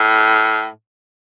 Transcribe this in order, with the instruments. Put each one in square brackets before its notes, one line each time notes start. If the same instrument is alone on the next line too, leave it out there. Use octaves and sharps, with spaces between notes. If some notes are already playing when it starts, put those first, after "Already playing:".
Already playing: [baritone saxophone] A2